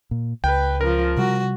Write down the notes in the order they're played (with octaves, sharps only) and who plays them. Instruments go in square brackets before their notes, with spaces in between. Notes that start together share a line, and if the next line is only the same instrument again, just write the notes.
[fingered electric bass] A#2
[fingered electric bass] C#2 [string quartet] B4 [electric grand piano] G5
[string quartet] C#3 F3 [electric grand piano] A#4
[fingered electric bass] C3 G3 [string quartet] F#4